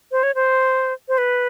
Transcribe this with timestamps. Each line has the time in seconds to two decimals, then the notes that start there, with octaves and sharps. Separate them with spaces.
0.12 C5
0.23 C#5
0.35 C5
1.08 C5
1.18 B4